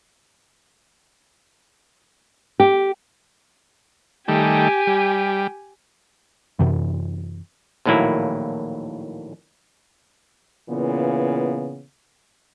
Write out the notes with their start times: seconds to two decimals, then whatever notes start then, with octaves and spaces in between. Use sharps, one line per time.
2.60 G4
4.28 D#3 G3 A3 G4 G#5
4.87 G3
6.59 F#2 C3 E3
7.85 A#1 D#2 A2 F#3 A#3 E4
10.70 A#2 C#3 E3 B3